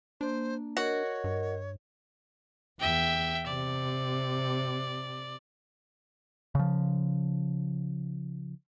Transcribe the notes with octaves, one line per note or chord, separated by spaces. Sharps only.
A#3 D4 C5
F#4 A#4 C#5 D#5
G2
E2 E5 G5
C3 D5
C#3 F3